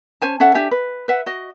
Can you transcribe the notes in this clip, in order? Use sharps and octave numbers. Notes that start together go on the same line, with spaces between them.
C#4 C5 G#5 A5
C#4 A4 E5 F#5
D4 G4 E5 G#5
B4
B4 E5 F#5
F#4 D#5